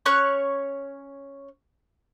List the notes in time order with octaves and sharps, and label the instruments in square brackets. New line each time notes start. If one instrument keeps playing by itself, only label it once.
[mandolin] C#4 C#5 C#6 F#6